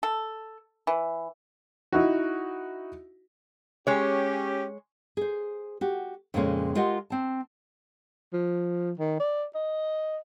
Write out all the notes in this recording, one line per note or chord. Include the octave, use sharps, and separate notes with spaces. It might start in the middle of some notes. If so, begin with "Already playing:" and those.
A4
E3
D#4 E4 F#4
G#3 C#4 G4 C#5
G#4 C5
F#4 G4
F2 A#2 C#3 G#3 A#3 C#4
G#3 F4 G4 A#4 D#5 F#5
C4 A5
F3
D#3
D5
D#5